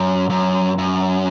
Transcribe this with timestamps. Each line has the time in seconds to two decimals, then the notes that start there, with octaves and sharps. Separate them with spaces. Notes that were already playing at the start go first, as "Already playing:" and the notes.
Already playing: F#2
0.30 F#2
0.78 F#2